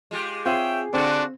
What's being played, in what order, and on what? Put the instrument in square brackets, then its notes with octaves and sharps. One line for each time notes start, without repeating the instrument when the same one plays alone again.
[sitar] G#3 F4 G4
[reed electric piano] C4 F4 G6 [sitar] G#4 [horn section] C#5 E5 G5
[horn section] D3 [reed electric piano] C4 [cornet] D4 [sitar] F4 F#4